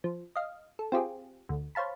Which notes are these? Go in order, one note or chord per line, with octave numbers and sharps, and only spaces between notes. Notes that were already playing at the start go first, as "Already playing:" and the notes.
F3
D#5 F5
A4
C4 F4 G4 G#4
D2
C5 C#5 F5 A5 B5